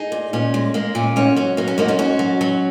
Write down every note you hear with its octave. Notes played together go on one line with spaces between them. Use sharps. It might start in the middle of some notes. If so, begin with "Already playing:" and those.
Already playing: D#4 G#4
A#2
A#2 C#4
G#3
G#3 A#3
A#2 C#4
G#2 C#4
F#3 C#4
F#3 A#3
C#4
G#2 A#3 D#4
C#4 F#4
G#2 C#4 F#4
F#3
F#3